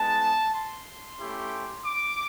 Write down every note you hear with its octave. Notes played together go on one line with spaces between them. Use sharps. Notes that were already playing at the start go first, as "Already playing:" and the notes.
Already playing: G#3 B3 D#4 A5
C6
A3 C#4 E4 G4
D6